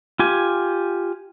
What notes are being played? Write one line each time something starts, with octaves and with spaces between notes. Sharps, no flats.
F4 G4 G#5